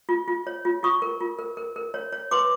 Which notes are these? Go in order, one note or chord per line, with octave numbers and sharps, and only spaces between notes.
F4
F4
C#5
F4
F4 C#6 D#6
A#4
F4
A#4
A#4
A#4
C#5
C#5
B4 C6 D6